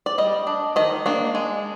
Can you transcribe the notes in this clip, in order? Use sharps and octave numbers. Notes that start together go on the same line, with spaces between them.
D5
G3 D#5
D4
D#3 D#5
A#3 D4
G#3